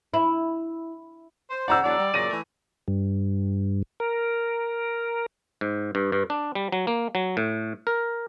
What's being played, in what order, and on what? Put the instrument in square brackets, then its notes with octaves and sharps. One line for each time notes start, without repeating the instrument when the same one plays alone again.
[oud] E4
[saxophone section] C5
[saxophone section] C#3 C5 D5 [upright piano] F#5 A#5 E6
[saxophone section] E2 F#3 D4 [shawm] D5
[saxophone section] G3
[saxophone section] A#2 C#3 F#3 [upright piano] A#6 D#7
[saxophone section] E3 A3
[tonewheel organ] G2
A#4
[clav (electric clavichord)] G#2
G2
G2
D4
G3
F#3
A#3
F#3
A2
A#4